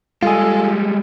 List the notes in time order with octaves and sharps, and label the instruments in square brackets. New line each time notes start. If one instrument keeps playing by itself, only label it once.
[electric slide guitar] G3 G#3 [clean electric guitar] F4 G#4 [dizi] A4